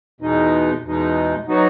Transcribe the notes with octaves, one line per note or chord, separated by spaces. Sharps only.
E2 B2 G#3 D#4
E2 B2 G#3 D#4
F#3 B3 D#4 F#4